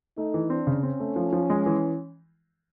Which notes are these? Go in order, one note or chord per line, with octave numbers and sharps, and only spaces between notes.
A3 D#4
E3
C4 D4
C#3
C4 C#4
A3
F3
F3
G#3
E3